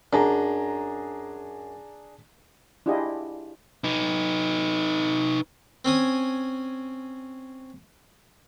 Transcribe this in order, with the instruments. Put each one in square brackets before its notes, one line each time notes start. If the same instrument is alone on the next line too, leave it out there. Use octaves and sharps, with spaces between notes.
[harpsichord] F#2 [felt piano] D4 G#4 A#5
[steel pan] D4 E4 F4 G4 G#4 D#5
[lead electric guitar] D#4 B4
[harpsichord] C4 C#4 G#5 D#6